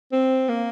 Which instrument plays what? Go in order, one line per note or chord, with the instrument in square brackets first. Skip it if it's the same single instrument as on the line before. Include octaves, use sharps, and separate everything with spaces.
[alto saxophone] C4
A#3